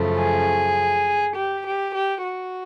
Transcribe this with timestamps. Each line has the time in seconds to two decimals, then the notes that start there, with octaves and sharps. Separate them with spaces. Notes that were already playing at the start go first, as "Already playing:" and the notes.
Already playing: F#2 C#3 F3 A3
0.18 G#4
1.35 G4
1.65 G4
1.94 G4
2.24 F#4